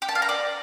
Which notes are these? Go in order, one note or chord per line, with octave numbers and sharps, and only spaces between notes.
G4
A5
F5
A#5
D5